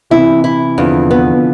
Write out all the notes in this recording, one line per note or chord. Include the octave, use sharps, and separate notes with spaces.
C3 E3 E4
E4
E2 D3 F3
B3